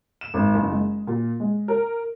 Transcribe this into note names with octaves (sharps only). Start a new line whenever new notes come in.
E7
G#1
F#1
G#3
A#2
G#3
A#4